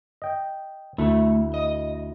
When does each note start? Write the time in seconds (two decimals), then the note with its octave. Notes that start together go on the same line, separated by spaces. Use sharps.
0.22 D#5 G5
0.98 D2 A3 E4
1.54 D#5